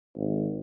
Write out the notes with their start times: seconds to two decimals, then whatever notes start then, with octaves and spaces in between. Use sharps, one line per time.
0.16 G#1